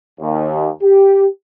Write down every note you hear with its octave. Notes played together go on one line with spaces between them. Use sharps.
D#2
G4